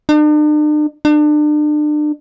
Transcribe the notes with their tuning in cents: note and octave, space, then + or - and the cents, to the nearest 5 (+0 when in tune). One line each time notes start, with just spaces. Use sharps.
D4 +45
D4 +35